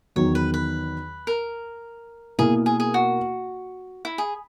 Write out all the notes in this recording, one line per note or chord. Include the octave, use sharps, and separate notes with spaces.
E2 D#3 F#3 C#5
B4
B4
A#4
B2 A#3 E4 G#4
G#4
G#4
F#4
E4
G#4